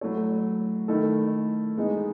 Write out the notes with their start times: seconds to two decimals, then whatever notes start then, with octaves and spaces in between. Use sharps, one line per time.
0.01 F#3 A3 E4 A4 C#5
0.88 D#3 A3 E4 A4
1.77 E3 G#3 B3 D#4